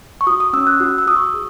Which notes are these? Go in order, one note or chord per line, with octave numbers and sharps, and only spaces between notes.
C#6
F#4 D#6
D#6
C#4 E6
F#6
F#4 E6
E6
F#4 D#6
C#6
G#4